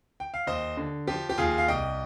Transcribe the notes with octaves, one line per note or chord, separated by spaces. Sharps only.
G5
F5
D#2 C5 D#5
D3
F3 G4
G4
D#2 F4 G#4
F5
C2 D#5 G5